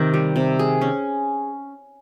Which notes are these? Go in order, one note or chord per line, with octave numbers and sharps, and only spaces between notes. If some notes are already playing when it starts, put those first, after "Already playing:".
Already playing: C3 D#3
G3
C3
G#4
C#4